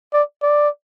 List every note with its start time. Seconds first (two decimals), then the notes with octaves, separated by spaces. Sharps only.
0.13 D5
0.43 D5